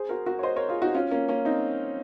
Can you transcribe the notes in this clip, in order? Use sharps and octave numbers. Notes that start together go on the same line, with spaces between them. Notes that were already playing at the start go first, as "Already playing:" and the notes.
Already playing: G#4 C5
F#4 A#4
F#4 A#4
C#5
C5 D#5
A#4 C#5
F4 G#4
D#4 F#4
C#4 F4
A#3 C#4
A#3 C#4
C4 D#4